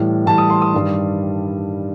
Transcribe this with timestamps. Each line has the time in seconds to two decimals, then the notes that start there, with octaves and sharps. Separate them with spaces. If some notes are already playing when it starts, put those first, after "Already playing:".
Already playing: A2 E3 G3
0.26 A2 E3 G3 A5
0.38 D#6
0.50 C6
0.61 D#6
0.74 G2 D#3 G3